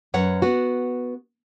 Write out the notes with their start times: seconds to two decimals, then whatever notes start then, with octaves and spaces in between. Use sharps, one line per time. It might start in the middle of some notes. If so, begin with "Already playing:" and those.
0.14 F#2 B4 C#5 F#5
0.42 B3 F#4